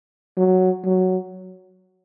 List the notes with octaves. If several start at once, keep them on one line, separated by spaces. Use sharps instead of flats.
F#3
F#3